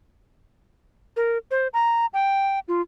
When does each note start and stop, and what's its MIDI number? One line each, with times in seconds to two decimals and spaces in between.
1.17 1.38 70
1.51 1.68 72
1.74 2.06 82
2.14 2.59 79
2.68 2.81 65